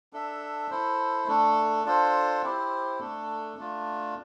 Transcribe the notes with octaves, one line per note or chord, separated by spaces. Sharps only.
D4 A4 E5
E4 A4 C5
A3 D4 A4
D4 F4 A4 C5
C4 E4 G4 C5
A3 D4 A4
A3 D4 F4